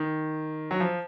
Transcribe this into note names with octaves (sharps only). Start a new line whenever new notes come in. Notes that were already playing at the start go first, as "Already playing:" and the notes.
Already playing: D#3
F#3
F3